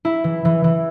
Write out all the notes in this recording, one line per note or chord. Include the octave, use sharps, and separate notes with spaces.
E4
E3
E3
E3